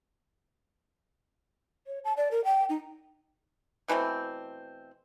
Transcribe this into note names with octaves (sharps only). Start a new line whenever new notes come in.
C#5
A5
D5
A#4
G5
D#4
B2 E3 A3 C4